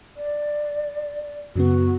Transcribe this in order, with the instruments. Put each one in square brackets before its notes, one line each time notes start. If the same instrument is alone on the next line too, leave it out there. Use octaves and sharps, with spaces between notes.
[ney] D5
[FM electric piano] F#2 C#3 B3 [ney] F#4